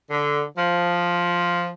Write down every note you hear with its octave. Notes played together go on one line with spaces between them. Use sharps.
D3
F3